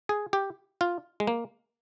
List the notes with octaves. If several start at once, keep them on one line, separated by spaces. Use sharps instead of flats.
G#4
G4
F4
G#3
A#3